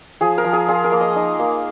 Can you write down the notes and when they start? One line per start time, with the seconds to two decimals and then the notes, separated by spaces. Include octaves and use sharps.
0.21 F3 G#4
0.38 A#4
0.45 F3
0.53 G#4
0.68 F4 G#4
0.84 A#4
0.92 A#3
1.01 D#5
1.16 D#4
1.39 A#3